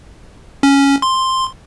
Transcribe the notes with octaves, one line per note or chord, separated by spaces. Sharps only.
C#4
C6